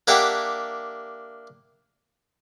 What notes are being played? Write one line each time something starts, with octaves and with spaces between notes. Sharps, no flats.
A#3 D4 G4 E5 F#5 G5